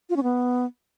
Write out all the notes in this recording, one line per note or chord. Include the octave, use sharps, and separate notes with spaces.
F4
C#4
B3